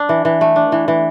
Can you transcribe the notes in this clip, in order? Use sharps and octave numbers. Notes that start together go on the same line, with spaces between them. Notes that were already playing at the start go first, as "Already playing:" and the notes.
Already playing: D4
E3
E3
A3
D4
E3
E3